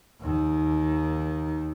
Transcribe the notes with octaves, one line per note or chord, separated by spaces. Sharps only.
D#2 D#3